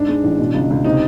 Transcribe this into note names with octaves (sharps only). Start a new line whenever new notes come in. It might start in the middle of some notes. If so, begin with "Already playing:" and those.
Already playing: G#2 D4
G#3
A1
B2
C#2
C#2
C3 D#4